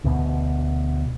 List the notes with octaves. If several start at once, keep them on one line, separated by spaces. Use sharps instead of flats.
D2 B2